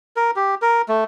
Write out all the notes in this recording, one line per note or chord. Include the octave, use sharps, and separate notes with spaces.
A#4
G4
A#4
A3